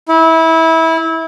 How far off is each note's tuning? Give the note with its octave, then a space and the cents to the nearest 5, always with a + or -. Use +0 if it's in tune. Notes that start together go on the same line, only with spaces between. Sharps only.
E4 -20